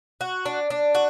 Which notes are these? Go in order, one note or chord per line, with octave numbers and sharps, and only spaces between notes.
F#4
D4
D4
F#4